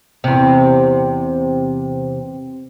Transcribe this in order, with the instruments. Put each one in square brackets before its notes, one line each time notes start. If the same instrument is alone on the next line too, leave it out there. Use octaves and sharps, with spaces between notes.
[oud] E2 C3